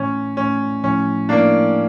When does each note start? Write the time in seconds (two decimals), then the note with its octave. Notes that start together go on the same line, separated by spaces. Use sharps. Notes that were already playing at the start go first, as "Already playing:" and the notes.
Already playing: A2 E3 A3 C#4
0.37 A2 E3 A3 C#4
0.83 A2 F3 A3 C#4 E4
1.29 A2 F3 A3 A#3 D4 E4